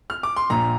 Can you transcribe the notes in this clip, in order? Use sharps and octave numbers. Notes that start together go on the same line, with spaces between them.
F6
D6
C6
A#1 A#2 F3 A#5